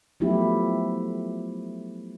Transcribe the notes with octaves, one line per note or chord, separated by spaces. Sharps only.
F3 F#3 A3 B3 E4 G4